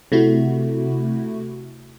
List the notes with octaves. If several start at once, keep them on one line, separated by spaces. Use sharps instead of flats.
C3 A3 E4 F#4